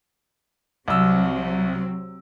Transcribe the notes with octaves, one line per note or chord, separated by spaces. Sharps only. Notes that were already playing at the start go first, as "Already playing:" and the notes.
C2 C3 F#3 C4 E6